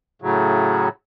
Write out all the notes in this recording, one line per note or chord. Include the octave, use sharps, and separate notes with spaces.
A2 C#3 F#3